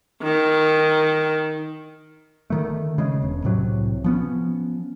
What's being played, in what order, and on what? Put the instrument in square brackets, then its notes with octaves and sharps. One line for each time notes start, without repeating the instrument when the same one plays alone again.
[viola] D#3
[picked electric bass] D3 D#3 A3
C#3 G#3
E1
C2 A2 C3 F#3
F3 B3 C#4